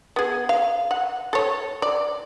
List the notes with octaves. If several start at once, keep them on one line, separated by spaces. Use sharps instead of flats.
B3 G#4
F5
F#5
A4 C#5
D5